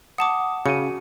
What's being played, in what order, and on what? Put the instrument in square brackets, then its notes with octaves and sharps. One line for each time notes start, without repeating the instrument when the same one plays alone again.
[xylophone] F#5 A5 D6 [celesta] D#6
[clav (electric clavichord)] C#3 [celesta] F#4 D#7 [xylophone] C#7